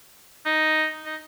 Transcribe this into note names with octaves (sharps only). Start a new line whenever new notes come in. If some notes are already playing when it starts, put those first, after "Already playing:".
D#4
D#4